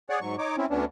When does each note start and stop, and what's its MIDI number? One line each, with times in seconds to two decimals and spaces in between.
0.10 0.20 68
0.10 0.20 73
0.10 0.20 74
0.10 0.20 78
0.21 0.36 44
0.21 0.36 54
0.21 0.36 85
0.39 0.56 63
0.39 0.56 73
0.39 0.56 86
0.57 0.66 60
0.57 0.66 61
0.57 0.66 64
0.70 0.85 38
0.70 0.85 59
0.70 0.85 61
0.70 0.85 62